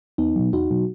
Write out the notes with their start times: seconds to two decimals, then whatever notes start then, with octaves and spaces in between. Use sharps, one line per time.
0.18 E2 B3 D#4
0.36 B2 F#3
0.53 E2 D#4 F#4
0.71 B2 F#3